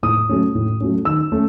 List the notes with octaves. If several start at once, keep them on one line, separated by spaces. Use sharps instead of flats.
A2 D#6
F#3 A3 C#4
A2
F#3 A3 C#4
D#3 E6
A3 C#4